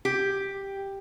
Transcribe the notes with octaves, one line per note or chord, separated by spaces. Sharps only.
G4